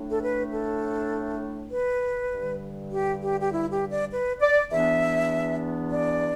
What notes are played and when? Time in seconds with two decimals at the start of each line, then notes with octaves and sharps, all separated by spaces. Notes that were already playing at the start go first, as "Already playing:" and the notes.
Already playing: A2 A3 D4
0.10 A4
0.22 B4
0.51 A4
1.71 B4
2.31 G2 D3 G3
2.91 G4
3.21 G4
3.39 G4
3.51 E4
3.70 G4
3.90 D5
4.11 B4
4.40 D5
4.70 E2 E3 B3 D4 E5
5.91 D5